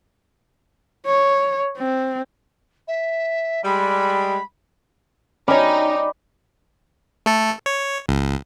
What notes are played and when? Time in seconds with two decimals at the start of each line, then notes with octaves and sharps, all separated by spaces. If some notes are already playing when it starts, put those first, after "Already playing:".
1.06 C#5
1.78 C4
2.87 E5
3.64 G3 G#3 B5
5.48 C#4 D#4 C#5 D5 G5 B5
7.26 A3 A4
7.66 C#5
8.08 C#2